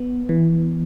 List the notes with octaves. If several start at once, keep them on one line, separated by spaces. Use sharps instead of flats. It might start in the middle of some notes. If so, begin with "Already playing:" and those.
Already playing: B3
E3